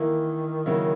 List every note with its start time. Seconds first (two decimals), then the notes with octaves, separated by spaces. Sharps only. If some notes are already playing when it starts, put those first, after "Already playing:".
Already playing: D#3 E3 A#3 E4
0.66 C#3 F#3 A#3 E4